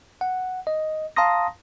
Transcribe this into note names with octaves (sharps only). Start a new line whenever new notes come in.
F#5
D#5
F5 A5 A#5 C6 D#6 A#6